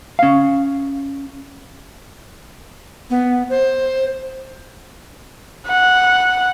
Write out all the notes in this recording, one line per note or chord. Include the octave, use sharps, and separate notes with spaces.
C#4 F5
B3
C5
F#5